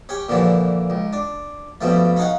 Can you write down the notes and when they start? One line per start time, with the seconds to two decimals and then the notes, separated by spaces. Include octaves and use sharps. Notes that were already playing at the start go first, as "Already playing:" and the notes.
0.09 C#4 G4
0.29 A#2 D3 E3 F3
0.90 C#2
1.13 D4
1.81 G2 B2 F3 A3
2.17 C#4 D#4 F5 F#5